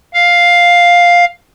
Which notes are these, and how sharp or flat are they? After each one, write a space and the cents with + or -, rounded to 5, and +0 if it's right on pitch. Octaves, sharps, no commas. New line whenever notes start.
F5 +5